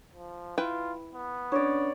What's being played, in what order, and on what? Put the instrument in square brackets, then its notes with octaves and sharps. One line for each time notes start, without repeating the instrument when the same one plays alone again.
[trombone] F3
[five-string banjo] E4 B4 G5 [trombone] F4
[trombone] B3
[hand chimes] C#4 D4 [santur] C#5 D5